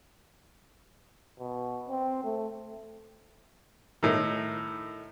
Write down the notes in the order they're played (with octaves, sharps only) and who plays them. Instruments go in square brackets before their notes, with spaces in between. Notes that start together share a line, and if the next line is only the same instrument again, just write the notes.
[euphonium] B2
C4
A3
[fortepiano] A2 D#3